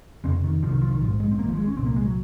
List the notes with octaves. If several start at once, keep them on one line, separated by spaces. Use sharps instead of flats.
F1 F2 C#3 C4
D#3
C2 C3 F3
D#3
F3
D#3
A#1 G#2 F3
G#3
C4
G#1 G#2 A#3
F3
G#3
C#4
C2 A#2 C4
A#3
G#3
F#3